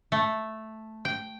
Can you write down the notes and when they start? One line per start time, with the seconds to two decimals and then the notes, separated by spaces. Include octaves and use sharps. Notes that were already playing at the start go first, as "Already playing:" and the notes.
0.12 A3
1.05 G5